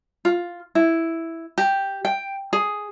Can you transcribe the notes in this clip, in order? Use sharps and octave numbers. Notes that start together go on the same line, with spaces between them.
F4
E4
G4
G5
G#4